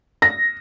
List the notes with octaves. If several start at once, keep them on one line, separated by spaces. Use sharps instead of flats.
A#6